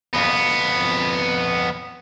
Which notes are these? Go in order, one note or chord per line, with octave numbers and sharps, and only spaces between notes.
F2 B3